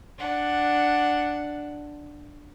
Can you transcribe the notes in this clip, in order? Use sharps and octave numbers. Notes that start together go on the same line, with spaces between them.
D4 F#5